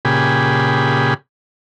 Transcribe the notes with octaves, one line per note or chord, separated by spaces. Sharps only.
A#2 C#3 G4 G#4 B5